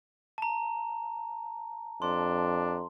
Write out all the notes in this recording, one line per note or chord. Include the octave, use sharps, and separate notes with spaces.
A5 A#5
F2 D4 C6